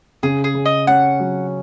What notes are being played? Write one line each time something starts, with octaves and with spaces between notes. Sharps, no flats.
C#3 G#4
G#4
C#3
D#5
C#4 F#5
F#3